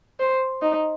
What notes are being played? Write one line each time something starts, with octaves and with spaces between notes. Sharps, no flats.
C5
D#4